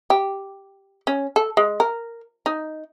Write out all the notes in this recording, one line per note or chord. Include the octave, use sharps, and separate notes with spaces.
G4
C#4
A4
G#3
A#4
D#4